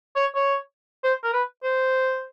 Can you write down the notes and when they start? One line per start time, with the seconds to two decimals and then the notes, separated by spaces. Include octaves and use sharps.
0.16 C#5
0.35 C#5
1.04 C5
1.24 A#4
1.33 B4
1.64 C5